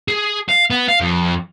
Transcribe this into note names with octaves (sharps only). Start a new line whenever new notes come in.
G#4
F5
B3
F5
F2